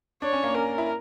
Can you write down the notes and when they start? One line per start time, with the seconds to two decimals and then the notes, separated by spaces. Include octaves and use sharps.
0.22 D4 C#5
0.33 C#4
0.44 A#3
0.55 C#4 A#4
0.78 E4